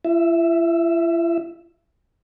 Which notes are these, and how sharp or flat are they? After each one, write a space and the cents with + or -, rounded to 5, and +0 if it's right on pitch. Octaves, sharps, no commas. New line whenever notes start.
E4 +45 E5 +0